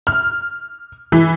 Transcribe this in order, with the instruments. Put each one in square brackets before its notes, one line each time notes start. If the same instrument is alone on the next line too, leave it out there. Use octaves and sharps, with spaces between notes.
[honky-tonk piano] F6
E3